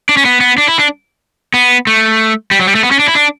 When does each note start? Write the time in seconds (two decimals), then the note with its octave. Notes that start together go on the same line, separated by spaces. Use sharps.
0.09 D4
0.17 C#4
0.25 B3
0.41 B3
0.58 D4
0.68 E4
0.79 D4
1.54 B3
1.87 A3
2.51 G3
2.59 F#3
2.67 G3
2.75 A3
2.83 B3
2.91 C#4
2.99 D4
3.08 E4
3.15 D4